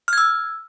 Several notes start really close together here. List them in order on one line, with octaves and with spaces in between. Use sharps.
F6 G#6 E6